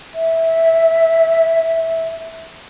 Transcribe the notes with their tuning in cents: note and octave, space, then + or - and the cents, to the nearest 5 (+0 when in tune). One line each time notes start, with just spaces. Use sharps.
E5 -10